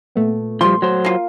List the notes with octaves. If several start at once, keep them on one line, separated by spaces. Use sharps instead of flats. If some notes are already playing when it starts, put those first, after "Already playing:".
A#2 A3 B3
F3 G3 C6
F#3 C5
A#3 F4